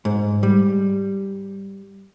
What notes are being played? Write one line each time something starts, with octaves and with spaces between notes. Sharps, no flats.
G#2
G3